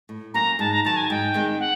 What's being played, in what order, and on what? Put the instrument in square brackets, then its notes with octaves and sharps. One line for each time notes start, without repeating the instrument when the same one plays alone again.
[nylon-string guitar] A2
[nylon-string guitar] F#3 A#3 C#4 F#4 [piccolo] A#5
[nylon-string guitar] G#2 [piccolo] A5
[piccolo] A#5
[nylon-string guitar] D#3 F#3 [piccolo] A5
[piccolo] G#5
[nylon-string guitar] G#2 [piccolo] G5
[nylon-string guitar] D#3 G#3 C4
[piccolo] F#5